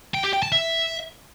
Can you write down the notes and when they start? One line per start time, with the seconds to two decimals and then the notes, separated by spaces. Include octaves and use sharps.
0.14 G5
0.24 G4
0.33 G5
0.43 A5
0.52 E5